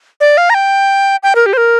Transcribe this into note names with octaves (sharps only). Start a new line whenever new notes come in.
D5
F5
A#5
G5
G5
A#4
G4
C5
A#4